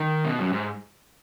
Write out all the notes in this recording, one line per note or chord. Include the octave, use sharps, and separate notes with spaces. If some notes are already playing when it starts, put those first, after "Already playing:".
Already playing: D#3
B2
F#2
G#2